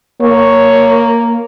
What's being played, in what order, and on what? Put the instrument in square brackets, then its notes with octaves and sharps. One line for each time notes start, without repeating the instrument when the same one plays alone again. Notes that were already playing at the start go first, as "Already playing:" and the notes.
[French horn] A#3 [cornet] C#5